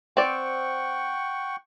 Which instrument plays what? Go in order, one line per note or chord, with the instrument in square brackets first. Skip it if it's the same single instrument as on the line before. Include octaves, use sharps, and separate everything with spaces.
[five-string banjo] C4 D5 [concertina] F#5 G5 C#6